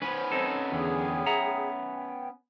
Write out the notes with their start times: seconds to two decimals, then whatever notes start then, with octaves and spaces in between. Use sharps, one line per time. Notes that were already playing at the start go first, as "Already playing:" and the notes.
0.02 B3 C#4 B4 C5 B5
0.32 C4 D#4 A4
0.72 E2 D3 G#4 G5
1.27 E5 F#5 A#5
1.94 G5